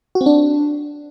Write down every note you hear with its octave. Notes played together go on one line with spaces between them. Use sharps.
F#4
C4
D4